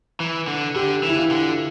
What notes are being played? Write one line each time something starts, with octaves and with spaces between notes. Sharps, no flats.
E3
D3
D3 G4
E3
E4
F4
D3